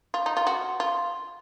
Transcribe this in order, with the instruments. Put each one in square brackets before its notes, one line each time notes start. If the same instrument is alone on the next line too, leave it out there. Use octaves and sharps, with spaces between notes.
[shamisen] F4
D#4
F4
F#4
F4